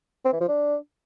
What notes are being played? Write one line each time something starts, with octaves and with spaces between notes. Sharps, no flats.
C4
E3
F3
D4